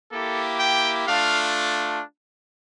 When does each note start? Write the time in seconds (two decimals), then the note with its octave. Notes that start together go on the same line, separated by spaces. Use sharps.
0.12 A#3 E4 G4 A4
0.60 G5
1.07 A3 D4 F4 F5